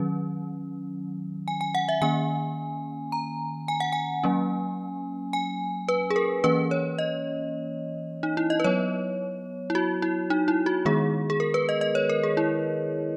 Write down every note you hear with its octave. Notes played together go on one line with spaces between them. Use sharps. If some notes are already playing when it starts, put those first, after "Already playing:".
Already playing: D#3 F#3 C#4
G#5
G#5
F#5
E5
D#3 A#3 C#4 G#5
A#5
G#5
F#5
G#5
F#3 A#3 C#4
G#5
B4
G#4
A#4
E3 A#3 C#4 B4
C#5
D#5
D#4
E4
D#5
B4
F#3 B3 C#5
E4
F#4
E4
D#4
E4
F#4
D#3 G#3 B3 G#4
G#4
A#4
B4
D#5
D#5
C#5
A#4
G#4
E4